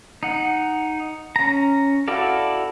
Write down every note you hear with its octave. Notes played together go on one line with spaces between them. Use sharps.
D#4 F#5
C#4 A#5
E4 F#4 A4 D5 F5